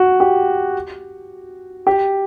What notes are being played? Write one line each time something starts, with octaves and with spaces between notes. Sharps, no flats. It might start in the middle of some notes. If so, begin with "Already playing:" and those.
Already playing: F#4
G4
G4